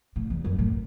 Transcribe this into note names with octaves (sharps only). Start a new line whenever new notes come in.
A2
E2
F#2
A2